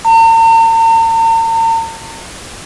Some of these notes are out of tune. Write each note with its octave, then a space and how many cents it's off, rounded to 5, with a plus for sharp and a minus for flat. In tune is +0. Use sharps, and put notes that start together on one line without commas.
A#5 -45